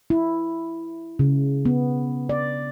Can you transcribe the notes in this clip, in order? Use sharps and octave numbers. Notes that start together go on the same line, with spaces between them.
E4
C#3
B3
D5